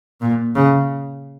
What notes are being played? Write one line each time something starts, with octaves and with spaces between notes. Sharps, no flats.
A#2
C#3